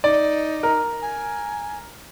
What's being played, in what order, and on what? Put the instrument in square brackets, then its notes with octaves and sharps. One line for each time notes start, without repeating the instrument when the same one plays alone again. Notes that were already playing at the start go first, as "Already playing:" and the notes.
[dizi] D#4 [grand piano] D5
[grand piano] A#4
[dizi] G#5